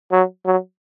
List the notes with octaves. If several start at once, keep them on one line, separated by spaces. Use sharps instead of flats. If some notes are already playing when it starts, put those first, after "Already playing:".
F#3
F#3